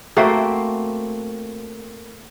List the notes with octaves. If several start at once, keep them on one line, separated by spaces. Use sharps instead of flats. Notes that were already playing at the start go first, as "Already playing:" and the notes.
A3 A#3 C4 F#4